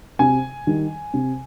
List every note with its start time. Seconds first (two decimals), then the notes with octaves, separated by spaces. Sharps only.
0.19 C3 G#5
0.67 D#3 G3
1.14 C3